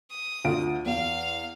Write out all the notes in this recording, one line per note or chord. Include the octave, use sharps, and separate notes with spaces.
D#6
D2 F4 D7
E2 F5